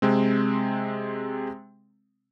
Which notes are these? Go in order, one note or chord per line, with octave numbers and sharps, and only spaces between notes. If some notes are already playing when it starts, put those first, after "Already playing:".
C3 G#3 C4